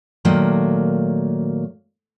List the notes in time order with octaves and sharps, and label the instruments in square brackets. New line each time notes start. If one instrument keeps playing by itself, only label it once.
[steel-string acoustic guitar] A#2 D#3 F#3 A3 A#3